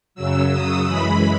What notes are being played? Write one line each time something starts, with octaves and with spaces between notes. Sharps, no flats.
F#2 C#3 F#3 E6
D#6
F#2 E3 G#3 B5